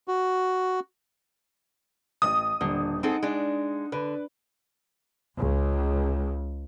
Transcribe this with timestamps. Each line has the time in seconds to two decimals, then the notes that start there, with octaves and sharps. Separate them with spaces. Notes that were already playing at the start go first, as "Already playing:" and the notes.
0.08 F#4
2.22 A1 D#6
2.61 D#1 D3
3.03 C4 D#4 G#4 A4 F#5
3.23 G#3 D4
3.92 D3 B4
5.36 C#2